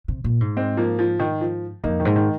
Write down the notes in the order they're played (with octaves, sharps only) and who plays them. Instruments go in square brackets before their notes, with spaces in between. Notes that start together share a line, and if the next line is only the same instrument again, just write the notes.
[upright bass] C3
A#2
G#2
[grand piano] G#3 C4
F3 A#3
F3
D#3
F3
[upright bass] F2 [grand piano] A#3 D#4
[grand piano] D#3
[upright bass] G#2
[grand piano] D#3